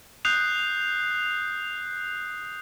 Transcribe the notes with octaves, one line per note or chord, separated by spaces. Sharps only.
D#6 F#6 G6 C7 F7